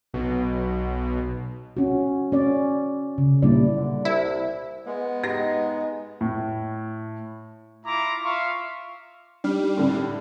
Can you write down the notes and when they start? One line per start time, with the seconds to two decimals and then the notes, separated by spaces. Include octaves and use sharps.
0.14 B1 B2
1.77 C#4 F#4
2.32 C#4 D5
3.18 C#3
3.42 A#2 G3 A#3 D4 E4 D5
3.77 D3
4.05 C2 E4
4.86 G#3 B3
5.23 G#2 D#4 G4 A#6
6.21 A2
7.86 E4 F4 A#5 C6 D6
8.24 F4 E5 F5 C6 C#6
9.44 G3 D4 D#4 F6
9.77 A2 D3